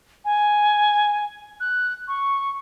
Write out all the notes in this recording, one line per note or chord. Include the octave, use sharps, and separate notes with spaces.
G#5
F#6
C#6